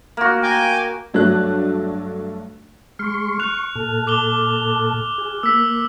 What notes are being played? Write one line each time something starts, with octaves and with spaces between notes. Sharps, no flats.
A#3 F#4
G5 G#5 D6
G2 F#3 A3 D4 F#6
G#3 C6 C#6 F6
C#6 F#6 F7
A#2 A4
D6 F7 G7
G#4
A#3 E6 B6